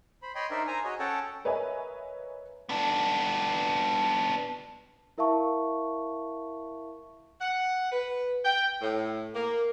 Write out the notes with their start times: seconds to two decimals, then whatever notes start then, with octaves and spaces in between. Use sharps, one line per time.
0.23 C5 B5
0.35 C#5 D#5 G5 B5 C6
0.51 D4 D#4 A#4 C5 D5 E5
0.67 C5 G#5 A#5
0.84 F#4 G#4 C#5 D#5
0.99 C#4 A4 C#5 F#5 G5 A5
1.45 A#4 B4 C#5 D#5 E5 G#5
2.69 B3 D4
5.18 E4 A#4 E5 F5 A5 C#6
7.41 F#5
7.92 B4
8.45 G5
8.82 A2
9.34 A#3